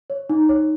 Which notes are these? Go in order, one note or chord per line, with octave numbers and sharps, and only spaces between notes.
C#5
D#4
C#5